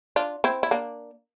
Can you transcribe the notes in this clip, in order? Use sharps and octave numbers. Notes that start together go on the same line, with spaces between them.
D4 F4
C4 E4
E4
A#3 D4